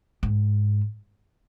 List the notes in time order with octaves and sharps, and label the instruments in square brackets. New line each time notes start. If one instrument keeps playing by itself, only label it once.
[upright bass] G#2